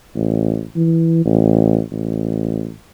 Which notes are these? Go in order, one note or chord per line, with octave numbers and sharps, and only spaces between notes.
A1
E3
A1
A1